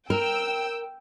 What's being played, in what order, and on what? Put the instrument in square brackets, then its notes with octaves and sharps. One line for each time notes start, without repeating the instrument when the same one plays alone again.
[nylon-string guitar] A#4 [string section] G5 E6